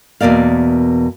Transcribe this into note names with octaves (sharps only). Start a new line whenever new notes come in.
E2 B2 A#3 D5 F5